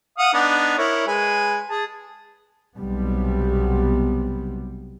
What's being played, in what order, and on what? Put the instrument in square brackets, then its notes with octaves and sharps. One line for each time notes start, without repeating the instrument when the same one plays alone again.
[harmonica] F5 F#5 D#6
B3 D4 D#4
E4 A#4 C#5
G#3 B4 G#5
G#4 A5
[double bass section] B1 C3 G3 B3